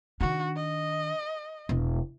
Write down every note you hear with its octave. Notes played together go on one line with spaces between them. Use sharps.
D#3 D4 F#4
D#5
E1